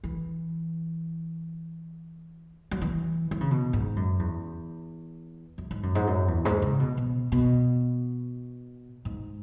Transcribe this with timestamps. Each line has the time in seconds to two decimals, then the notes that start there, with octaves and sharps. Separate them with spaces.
0.04 E3
2.71 F#3
2.82 E3
3.31 E3
3.41 C#3
3.51 B2
3.73 G#2
3.96 F#2
4.19 E2
5.58 F#2
5.71 G#2
5.83 F#2
5.95 G#2
6.07 F#2
6.28 E2
6.45 G#2
6.62 C#3
6.80 B2
6.97 B2
7.32 B2
9.05 G#2